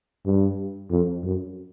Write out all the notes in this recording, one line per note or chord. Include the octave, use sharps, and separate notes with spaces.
G2
F2
F#2